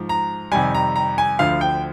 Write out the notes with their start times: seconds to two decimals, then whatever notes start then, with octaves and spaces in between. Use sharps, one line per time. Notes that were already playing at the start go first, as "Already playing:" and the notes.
Already playing: G#2 F3
0.09 A#5
0.52 F2 C3 D#3 G3 G#5
0.74 A#5
0.96 A#5
1.18 G#5
1.39 D2 D3 F3 F5
1.61 G5